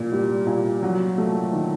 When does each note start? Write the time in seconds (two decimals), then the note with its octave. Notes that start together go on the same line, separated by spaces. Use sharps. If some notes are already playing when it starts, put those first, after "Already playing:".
Already playing: A#2 A#3
0.12 G3
0.47 A#2
0.83 F#3
1.18 A3
1.53 D#3